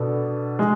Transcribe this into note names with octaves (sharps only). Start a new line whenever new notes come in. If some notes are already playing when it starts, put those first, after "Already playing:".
Already playing: B2 B3 D4 A4
G#3